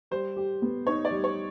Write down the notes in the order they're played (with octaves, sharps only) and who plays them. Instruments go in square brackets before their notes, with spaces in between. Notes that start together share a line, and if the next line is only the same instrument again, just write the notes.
[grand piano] G3 [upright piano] C5
[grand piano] G4
B3
[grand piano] D#4 [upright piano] C#5
[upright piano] D5
[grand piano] G3
[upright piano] C#5